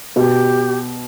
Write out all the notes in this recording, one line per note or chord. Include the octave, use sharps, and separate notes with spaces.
B2 G4